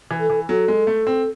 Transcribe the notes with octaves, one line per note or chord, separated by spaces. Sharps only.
E3
A4
E3
F#3 A4
G#3
A3
C4